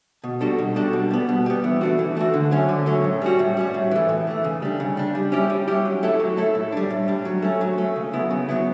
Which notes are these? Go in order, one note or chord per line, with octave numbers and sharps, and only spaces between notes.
B2
G3 D4 F#4 A4
B2
G3 D4 F#4 A4
B2
G3 B3
B2
G3 B3
E3
A3 D4 F#4
E3
A3 D4 F#4
D3
F#3 A3 C#4
D3
F#3 A3 C#4
A2
G3 C#4 F#4
A2
G3 C#4 F#4
A2
E3 A3
A2
E3 A3
C#3
G3 D4
C#3
G3 D4
G3
C#4 E4 G4
G3
C#4 E4 G4
F#3
A3 E4 A4
F#3
A3 E4 A4
A2
G3 D4
A2
G3 D4
F#3
A3 C#4
F#3
A3 C#4
C#3
F#3 B3 E4
C#3
F#3 B3 E4